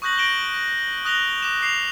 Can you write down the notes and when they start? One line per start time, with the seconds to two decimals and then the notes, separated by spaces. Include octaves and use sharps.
0.02 C#6 D#6 F#6 G6 A#6 F#7
0.18 A#6 D7 E7 F#7 G7
1.05 D#6 F#6 A#6 F7 G7
1.42 D6 E7
1.62 D6 C7 F7